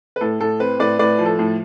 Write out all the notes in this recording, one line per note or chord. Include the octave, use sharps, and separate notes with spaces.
B4
A2 A4
A2 A4
C4 B4
A2 B4 D5
A2 B4 D5
F3
A4
A2